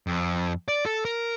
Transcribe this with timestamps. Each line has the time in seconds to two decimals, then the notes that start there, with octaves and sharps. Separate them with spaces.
0.07 F2
0.68 D5
0.86 A4
1.05 A#4